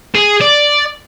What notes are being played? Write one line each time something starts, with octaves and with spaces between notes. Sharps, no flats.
G#4
D5